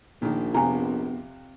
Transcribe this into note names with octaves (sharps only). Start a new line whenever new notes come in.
A#1 A#2 D#3
F2 C3 B3 G#5 A#5